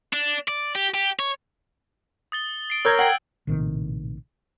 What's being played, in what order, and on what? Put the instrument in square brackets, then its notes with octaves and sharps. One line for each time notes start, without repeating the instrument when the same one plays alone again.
[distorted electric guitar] D4
D5
G4
G4
C#5
[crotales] D#6 A6 G7
C7 D7
[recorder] A#4 [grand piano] C#5 G6 G#6 [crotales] E6
[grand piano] F#5 G5 [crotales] G#6 C7 F#7
[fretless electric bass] A#1 A2 C3 D#3